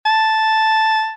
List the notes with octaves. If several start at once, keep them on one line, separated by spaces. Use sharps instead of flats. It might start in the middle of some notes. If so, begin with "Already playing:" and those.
A5